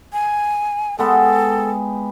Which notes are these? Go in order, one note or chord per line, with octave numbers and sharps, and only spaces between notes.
G#5
G#3 B3 G4 A4